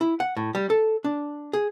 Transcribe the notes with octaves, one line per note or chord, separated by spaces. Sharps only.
E4
F#5
A2
G3
A4
D4
G#4